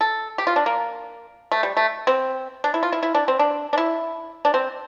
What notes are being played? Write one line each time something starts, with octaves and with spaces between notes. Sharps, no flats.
A4
G4
F4
D4
A#3
A3
G3
A3
C4
D4
E4
F4
E4
E4
D4
C4
D4
D4
E4
D4
C4